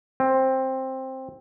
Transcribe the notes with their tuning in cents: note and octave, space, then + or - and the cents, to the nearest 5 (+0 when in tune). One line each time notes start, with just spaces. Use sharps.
C4 +10